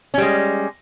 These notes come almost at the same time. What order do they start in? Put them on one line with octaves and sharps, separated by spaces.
C#4 G3 G#3